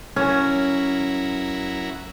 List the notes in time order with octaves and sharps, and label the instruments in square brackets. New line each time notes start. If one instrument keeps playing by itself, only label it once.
[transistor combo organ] F#3 E4 A#4 [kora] C#4